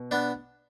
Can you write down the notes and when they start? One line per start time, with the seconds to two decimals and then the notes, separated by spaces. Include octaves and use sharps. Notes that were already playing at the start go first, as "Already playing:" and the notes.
Already playing: B2
0.11 B3 D4